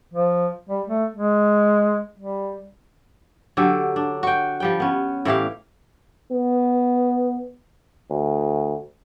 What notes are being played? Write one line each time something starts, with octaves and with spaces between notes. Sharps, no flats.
F3
G3
A3
G#3
G3
D3 F#3 G4 A4
D4
F#4 G5
F3 G3 G5
B3 C#4
A2 E3 G4 F5
B3
D2